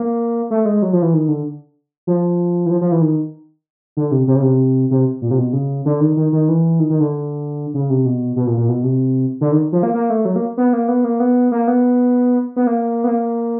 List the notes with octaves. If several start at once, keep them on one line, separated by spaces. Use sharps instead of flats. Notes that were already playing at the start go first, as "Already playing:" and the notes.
Already playing: A#3
A3
G#3
F#3
F3
E3
D#3
D3
F3
E3
F3
F3
E3
D#3
D3
C3
C3
C#3
C3
C3
A#2
C3
B2
C#3
D3
D#3
D#3
D#3
E3
D#3
D#3
D3
C#3
C3
B2
B2
A#2
A#2
B2
C3
D3
D#3
F3
A#3
A#3
A3
F#3
A#3
B3
A#3
B3
A#3
B3
A#3
B3
B3
A#3
B3
A#3